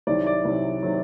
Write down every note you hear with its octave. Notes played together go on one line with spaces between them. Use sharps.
C2 C3 D#3 F#3 D5
D5
C2 C3 D#3 F#3
C3 D#3 F#3